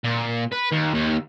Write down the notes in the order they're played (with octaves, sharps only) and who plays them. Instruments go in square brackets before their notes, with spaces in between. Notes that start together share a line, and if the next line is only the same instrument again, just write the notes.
[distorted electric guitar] A#2
B4
D#2
D#2